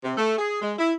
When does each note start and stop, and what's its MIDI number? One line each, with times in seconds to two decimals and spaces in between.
0.03 0.13 48
0.18 0.37 57
0.38 0.59 68
0.61 0.74 56
0.78 0.92 64